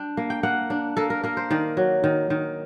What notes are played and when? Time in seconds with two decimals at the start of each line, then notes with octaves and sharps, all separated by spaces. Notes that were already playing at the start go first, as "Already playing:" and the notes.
Already playing: D4 G5
0.17 A#3
0.30 G5
0.43 A#3 F#5
0.70 D4
0.97 A#3 A4
1.10 A#4
1.23 A#3 A#4
1.37 C5
1.51 D#3 D5
1.77 F#3
2.04 D#3
2.30 D#3